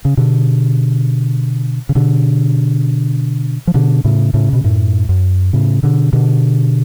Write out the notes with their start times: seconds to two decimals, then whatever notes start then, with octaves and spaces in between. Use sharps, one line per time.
0.05 C#3
0.17 B2 D3
1.89 C#3
1.95 B2 D3
3.67 F3
3.74 B2 D3
4.05 A2 C#3
4.34 A2 C#3
4.53 B2
4.64 F#2 A2
5.09 F#2
5.53 A2 C#3
5.83 B2 D3
6.13 B2 D3